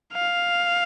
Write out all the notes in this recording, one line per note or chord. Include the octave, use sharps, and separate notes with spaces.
F5